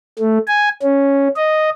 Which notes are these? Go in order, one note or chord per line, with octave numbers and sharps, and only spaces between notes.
A3
G#5
C#4
D#5